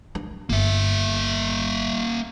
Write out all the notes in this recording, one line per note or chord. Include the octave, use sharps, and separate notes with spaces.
D4
G1 A#3 E5